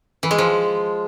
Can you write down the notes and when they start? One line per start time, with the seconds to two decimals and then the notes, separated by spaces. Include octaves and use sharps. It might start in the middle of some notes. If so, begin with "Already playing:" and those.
0.23 E3
0.31 G#3
0.38 F3